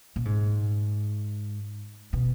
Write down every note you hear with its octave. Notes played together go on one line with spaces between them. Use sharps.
A#2
G#2
B2